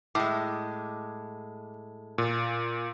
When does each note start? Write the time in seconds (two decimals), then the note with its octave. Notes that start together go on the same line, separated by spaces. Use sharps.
0.15 A2 G#3 D6
2.18 A#2